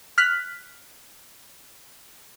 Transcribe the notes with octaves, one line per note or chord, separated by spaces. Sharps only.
F6 F#6 B6